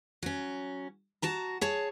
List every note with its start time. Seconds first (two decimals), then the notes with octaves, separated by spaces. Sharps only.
0.23 F#3 C#4
1.22 F#4 A5 A#5
1.61 G#4 C#5 A5